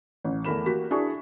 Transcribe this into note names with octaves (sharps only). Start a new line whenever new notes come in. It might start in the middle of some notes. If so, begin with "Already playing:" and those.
A1
E2 A3 A#4 B5 E7
A#3 F#4 G4 B6
D4 E4 F#4 G#4 G#5 C#6